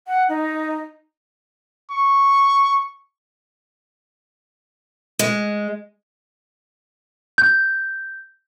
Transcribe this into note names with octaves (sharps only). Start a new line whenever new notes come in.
F#5
D#4
C#6
G#3
G6